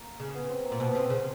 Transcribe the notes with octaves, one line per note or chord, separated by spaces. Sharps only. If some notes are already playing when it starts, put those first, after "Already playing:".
Already playing: A#3
C#3
B3
C4
A#3
A#2
B2 C4
B3
C3 C4
C#3